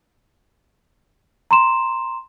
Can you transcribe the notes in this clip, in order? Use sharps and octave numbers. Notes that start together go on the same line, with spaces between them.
A#5 C6 E7